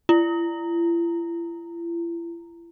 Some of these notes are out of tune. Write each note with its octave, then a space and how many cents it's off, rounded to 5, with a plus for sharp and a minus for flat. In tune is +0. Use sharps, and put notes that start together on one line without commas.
E4 +45